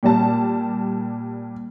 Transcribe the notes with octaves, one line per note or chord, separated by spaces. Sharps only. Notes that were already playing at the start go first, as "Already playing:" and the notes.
A#2 G3 A5